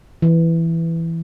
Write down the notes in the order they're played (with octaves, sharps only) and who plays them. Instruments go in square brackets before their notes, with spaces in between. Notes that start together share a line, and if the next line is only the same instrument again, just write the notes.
[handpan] E3